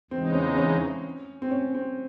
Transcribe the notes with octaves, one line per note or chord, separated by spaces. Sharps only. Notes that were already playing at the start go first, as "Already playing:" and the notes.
E2 C#3 E3 G#3 C4 D#4
C#4
C#4
C4
C#4
C4